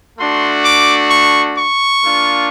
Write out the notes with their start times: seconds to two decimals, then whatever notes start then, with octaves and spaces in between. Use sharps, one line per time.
0.18 A3 D4 F#4 C6
0.64 D6
1.10 C#6
1.57 C#6
2.03 A#3 D4 F4